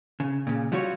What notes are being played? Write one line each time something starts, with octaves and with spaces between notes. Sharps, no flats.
C#3
A#2 C#3
F#3 G3 F4 F#4 G#4 C#5